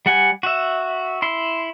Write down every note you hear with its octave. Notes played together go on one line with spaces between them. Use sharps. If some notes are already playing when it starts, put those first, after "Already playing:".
G3 F#5 G#5
F#4 E5
E4 C6